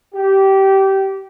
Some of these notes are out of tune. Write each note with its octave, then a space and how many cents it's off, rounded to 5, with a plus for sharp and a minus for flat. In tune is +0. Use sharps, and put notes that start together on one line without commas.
G4 -20